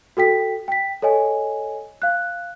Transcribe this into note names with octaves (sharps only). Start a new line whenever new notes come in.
F#4 A4 G5 B6
G5 B6
A4 C#5 D#5 G#5
F5 F#6